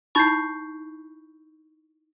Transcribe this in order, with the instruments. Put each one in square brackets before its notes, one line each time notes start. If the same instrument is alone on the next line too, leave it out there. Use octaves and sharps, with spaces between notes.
[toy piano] D#4 E4 B5 [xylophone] C#6 G6 C7